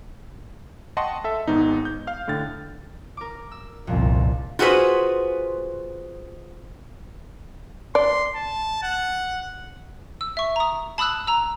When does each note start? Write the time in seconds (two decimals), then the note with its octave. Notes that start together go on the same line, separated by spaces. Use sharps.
0.97 D#5 F#5 G5 A5 C6 C#6
1.24 A4 E5
1.48 G#1 G#2 B3 D#4
1.85 G6
2.07 F5 F6
2.28 A2 D3 G5 A6
3.17 A#4 D6
3.51 E6
3.87 G1 C2 F2 A#2
4.59 F4 F#4 G#4 B4 C5
7.95 D5 C6
8.35 A5
8.83 F#5
10.21 E6
10.37 E5 C#6
10.56 A#5 D#6
10.98 A5 B5 D#6 E6 F#6
11.27 A#5 E6